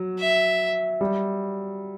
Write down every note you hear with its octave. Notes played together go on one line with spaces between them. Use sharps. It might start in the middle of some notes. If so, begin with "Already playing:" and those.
Already playing: F#3
E5
G3